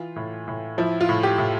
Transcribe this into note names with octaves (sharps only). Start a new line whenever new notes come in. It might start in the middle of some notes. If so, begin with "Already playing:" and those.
Already playing: E3 F4
A2
A2
F3 E4
F4
A2
G4
A2